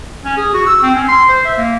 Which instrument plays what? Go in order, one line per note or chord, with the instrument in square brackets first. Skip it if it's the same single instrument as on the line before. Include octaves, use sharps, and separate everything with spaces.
[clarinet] C#4
G#4
F#4
E6
C4
C#4
C6
C5
E5
A#3